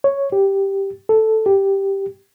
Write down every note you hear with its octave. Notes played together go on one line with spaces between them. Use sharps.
C#5
G4
A4
G4